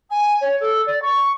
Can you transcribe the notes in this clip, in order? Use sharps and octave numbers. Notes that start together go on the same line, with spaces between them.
G#5
C#5
A4
D5
C#6